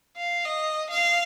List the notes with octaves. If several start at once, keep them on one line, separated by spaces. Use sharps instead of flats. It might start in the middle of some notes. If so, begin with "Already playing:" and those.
F5
D#5
F5